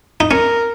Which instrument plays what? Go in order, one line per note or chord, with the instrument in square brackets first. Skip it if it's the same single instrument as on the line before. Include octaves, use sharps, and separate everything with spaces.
[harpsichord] D#4
[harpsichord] C#4 [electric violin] A#4